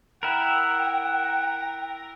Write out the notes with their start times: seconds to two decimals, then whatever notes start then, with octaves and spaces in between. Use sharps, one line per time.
0.23 E4 A#4 F#5 G5